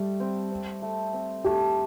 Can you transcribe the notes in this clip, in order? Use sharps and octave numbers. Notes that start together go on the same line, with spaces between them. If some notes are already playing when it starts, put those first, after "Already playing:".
Already playing: G3 A3
C4
C4
A3
C4
A3 G4